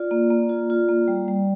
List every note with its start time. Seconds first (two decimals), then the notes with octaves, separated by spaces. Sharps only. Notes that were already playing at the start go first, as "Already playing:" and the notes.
Already playing: F4 D5
0.11 A#3
0.31 A#3
0.49 F4
0.70 F4
0.89 A#3
1.08 G3
1.28 G3